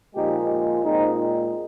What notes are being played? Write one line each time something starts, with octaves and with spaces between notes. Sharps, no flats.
A#2 F3 G#3 D#4 G4
A#2 G#3 C4 D#4